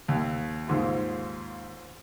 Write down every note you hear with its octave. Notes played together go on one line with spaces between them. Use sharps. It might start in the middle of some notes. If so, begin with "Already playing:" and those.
D#2
D#2 G#2 F4